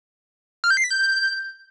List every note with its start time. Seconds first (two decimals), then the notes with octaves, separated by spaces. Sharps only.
0.64 F6
0.70 G6
0.77 C7
0.84 B6
0.91 G6